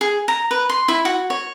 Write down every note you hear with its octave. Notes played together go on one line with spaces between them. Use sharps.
G#4
A#5
B4
C6
E4
F#4
C#5